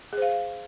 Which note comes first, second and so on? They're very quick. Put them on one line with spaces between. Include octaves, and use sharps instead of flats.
G#4 C5 F5